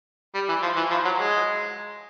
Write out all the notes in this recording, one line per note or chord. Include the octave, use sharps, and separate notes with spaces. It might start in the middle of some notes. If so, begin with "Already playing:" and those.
G3
E3
F3
E3
F3
F#3
G#3